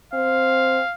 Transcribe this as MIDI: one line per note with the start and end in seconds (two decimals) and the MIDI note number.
0.13 0.80 60
0.13 0.95 77